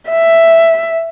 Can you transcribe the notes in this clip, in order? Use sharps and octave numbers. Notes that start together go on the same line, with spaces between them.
E5